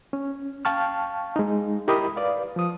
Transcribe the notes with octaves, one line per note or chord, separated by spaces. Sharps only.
C#4
F5 G5 A5 C#6 F6
G#3 D#4
E4 G4 A#4 D#5 B5 D#6
B4 D5 F5
F3 D#6